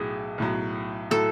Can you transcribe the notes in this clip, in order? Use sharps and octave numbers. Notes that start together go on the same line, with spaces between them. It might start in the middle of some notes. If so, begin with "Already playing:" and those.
Already playing: B1 A2 F#3 G#4
B1 A2 F#3
A2 F#3 A4